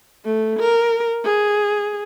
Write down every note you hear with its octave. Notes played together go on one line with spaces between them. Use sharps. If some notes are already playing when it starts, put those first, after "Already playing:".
A3
A#4
G#4